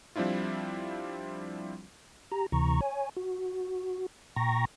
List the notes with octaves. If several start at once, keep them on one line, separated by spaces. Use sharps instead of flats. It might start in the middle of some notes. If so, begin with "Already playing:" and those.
F3 G3 C4 D4 E4 F4
G4 A#5
D2 C3 E3 A#5 C#6
C#5 G#5
F#4
A#2 G5 A#5 C#6 A#6